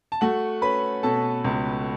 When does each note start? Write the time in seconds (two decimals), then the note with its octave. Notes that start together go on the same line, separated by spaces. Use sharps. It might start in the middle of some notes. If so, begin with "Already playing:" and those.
0.12 A5
0.21 A3 F#4 F#5
0.62 C#4 B4 B5
1.03 B2 A4 A5
1.44 C#2